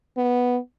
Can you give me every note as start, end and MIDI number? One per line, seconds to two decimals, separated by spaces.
0.17 0.58 59